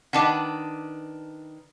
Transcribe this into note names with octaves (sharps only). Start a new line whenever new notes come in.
D#3 D4 B4 F#5 A5 D6